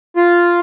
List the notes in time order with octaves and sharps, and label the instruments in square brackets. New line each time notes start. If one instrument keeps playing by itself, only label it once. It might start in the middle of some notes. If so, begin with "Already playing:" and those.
[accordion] F4